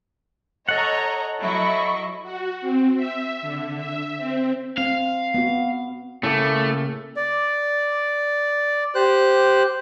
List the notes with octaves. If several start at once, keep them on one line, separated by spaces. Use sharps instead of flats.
A4 C#5 D#5 F#5 A#5
F#3 E4 D#5 C#6
F#4
C4
E5
D3
E5
C4
C4 F5
B3 F#4
A2 C#3 A3 A#3 D6
D5
G4 C5 F#6